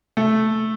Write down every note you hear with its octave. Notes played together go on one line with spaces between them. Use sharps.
A3